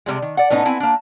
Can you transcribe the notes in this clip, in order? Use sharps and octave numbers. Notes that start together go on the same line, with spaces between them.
C3 D#3 G3 G#3
D#3
D5 F#5
A2 B3 C#4 D#4
B3 C4 E4 G#5
A#3 D4